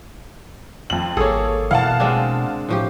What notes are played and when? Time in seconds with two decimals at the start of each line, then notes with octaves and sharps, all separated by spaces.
0.90 F2 F#7
1.17 G#1 A#3 G#4 A4 C#5
1.71 B2 E3 F5 F#5 A5
2.00 G#3 C4 D4
2.69 A2 F3 G4